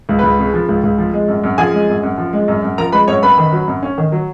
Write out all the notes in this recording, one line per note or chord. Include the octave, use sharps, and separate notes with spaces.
C#2
C#2 B4
C#3
F3
C#2
C#2
F3
G#3
F#2
F#2
F3 G#4 G#5
G#3
F#2
F#2
F3
G#3
F#2
F#2
F3 A#4 A#5
G#3 B4 B5
F#2 C#5 C#6
F#2 B4 B5
D#3
F#3
F#2
C#4
D#3
F#3